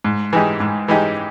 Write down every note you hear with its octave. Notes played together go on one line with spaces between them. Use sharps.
G#2
E3 G#3 D#4 G4
G#2
E3 G#3 D#4 G4